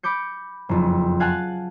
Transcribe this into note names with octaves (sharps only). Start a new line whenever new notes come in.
B5 D6 G6 C#7
F#1 F2
F5 F#5 G#5 A5 F#6